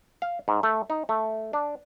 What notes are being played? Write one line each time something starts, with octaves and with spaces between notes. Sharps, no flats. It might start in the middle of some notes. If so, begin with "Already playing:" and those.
F5
G#2
A3
D#4
A3
D4